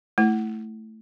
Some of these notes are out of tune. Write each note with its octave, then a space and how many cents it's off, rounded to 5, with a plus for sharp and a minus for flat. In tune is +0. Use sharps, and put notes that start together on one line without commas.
A3 +0 E4 +0